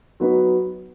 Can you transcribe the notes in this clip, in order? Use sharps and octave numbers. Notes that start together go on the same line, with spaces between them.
F#3 B3 D#4 F#4 B4